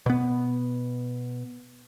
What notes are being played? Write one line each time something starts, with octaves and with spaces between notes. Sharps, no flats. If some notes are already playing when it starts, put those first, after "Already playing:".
B2 B3